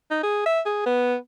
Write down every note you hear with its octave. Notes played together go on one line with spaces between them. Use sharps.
D#4
G#4
E5
G#4
B3